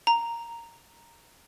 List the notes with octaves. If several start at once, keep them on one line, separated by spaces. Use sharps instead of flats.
A#5